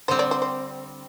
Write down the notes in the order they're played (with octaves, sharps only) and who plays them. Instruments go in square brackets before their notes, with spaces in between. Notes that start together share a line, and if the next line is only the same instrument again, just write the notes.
[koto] D3 G3 C4 [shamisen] C5
[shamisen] D5
C5
C5